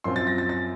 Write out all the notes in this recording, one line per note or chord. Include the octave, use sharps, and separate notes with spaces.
F#2 F3 C4 F4 C6
A6
A#6
A6
A6